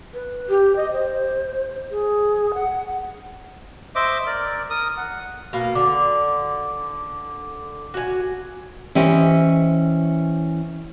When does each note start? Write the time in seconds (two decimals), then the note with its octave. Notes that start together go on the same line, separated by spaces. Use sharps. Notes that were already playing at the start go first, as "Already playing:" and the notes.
0.14 B4
0.49 G4
0.76 D#5
0.92 C5
1.91 G#4
2.54 F#5
3.95 C5 D#5 E5 D6
4.27 A#4 D5
4.70 A#4 D#6
4.97 F#5
5.53 B2 A#3
5.75 D3 D6
7.94 F#4 G#5
8.95 E3 C#4 G4 C5 D#5